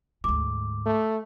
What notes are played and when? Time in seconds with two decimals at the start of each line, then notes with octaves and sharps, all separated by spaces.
0.24 D2 G#2 D6
0.86 A3